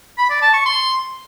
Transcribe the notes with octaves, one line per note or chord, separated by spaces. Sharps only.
B5
D5
A5
C#6
C6